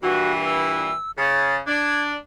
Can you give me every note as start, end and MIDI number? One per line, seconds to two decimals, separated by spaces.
0.02 0.91 43
0.02 0.91 46
0.02 0.91 52
0.02 0.32 66
0.44 1.11 88
1.18 1.57 49
1.18 1.56 93
1.67 2.15 62
1.67 2.02 92